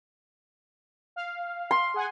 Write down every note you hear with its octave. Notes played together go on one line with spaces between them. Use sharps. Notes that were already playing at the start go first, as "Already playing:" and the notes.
F5
C6
G#4 F#5 G#5